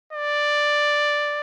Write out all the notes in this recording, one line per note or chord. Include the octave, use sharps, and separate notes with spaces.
D5